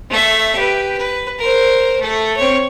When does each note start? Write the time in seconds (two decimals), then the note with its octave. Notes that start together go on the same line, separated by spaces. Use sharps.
0.10 A3 E5
0.55 G4 B4
0.98 B4
1.39 A#4 C5
2.01 A3 A4
2.36 C4 C#5